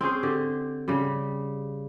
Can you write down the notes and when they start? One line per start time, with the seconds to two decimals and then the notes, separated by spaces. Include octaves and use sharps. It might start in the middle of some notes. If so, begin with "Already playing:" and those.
0.01 C4 C#4 G#4 C5
0.23 D3 G4
0.88 C#3 G3